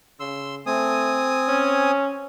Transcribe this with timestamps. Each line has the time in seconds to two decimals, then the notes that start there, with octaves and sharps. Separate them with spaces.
0.20 C#3 C6 E6
0.66 A3 C4 G#5 D#6
1.48 C#4